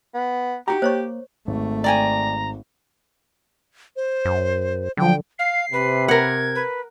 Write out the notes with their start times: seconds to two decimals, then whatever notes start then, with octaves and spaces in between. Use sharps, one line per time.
0.14 B3
0.68 D#4 F#4 G4 A#5
0.82 A#3 C5 C#5 C#6
1.47 G#1 A3
1.84 D5 G5 G#5 A#5
3.96 C5
4.25 F#2
4.97 D3 F3 F#3 G5
5.39 F5 C7
5.72 C3 B4
6.08 A#4 F#5 G#6
6.55 B4